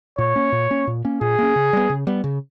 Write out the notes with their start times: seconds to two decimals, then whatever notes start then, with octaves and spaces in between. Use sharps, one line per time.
0.18 A#2 C#5
0.36 A#3 C#4
0.52 A#2
0.70 A#3 C#4
0.87 A#2
1.05 A#3 C#4
1.21 A#2 G#4
1.38 A#3 C#4
1.56 C#3
1.73 G3 B3
1.89 C#3
2.07 G3 B3
2.24 C#3